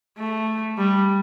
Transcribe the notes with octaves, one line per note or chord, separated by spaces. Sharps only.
A3
G3